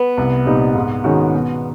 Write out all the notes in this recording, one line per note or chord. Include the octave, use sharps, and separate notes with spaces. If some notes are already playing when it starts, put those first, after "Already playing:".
Already playing: B3
C2
A#2 G3 C4 D#4
G#2
D#3 G#3 C#4 F#4
B2